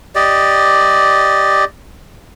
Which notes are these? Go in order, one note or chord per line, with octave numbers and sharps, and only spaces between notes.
G4 D5 D#5